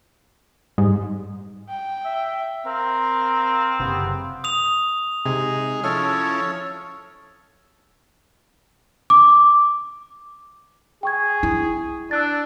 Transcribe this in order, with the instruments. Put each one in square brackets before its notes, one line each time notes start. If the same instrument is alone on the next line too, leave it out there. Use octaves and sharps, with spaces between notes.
[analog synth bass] G#2 [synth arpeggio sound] G3
[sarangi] G5
[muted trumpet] E5
[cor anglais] C4 [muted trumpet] A#4 [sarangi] F5
[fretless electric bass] F#1 C3 [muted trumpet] B3
[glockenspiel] D#6 F7
[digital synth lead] C3 [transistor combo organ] G#3 D#4 G#4
[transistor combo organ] F3 C#4 E4 [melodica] A4 C#5 [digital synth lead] F6
[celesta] D6
[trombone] G#4 [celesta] G5 C#6 G#6
[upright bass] E4
[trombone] D4 [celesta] E6 F#6 A6